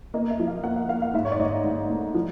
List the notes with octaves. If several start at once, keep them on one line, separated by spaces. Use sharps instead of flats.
A#3 D#5
E5
F3
F5
A#3 F#5
F5
A#3 F5
F5
G#2 E5
C#5
D5
G#2 D#5
G#2
A3
F3